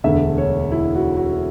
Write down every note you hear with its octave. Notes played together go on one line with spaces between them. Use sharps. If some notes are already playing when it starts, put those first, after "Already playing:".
E1 D2 D3 E5
C#5
E4
F#4
F#4